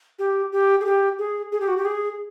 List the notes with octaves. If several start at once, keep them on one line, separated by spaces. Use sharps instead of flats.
G4
G4
G#4
G4
G#4
G#4
G4
F#4
G4
G#4